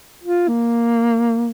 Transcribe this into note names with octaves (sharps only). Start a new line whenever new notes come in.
F4
A#3